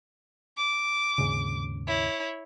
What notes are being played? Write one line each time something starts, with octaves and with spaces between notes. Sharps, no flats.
D6
D#2 G#2 C#3
E4 C#5